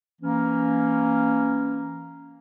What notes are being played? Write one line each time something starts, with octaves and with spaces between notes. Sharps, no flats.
E3 A#3 C#4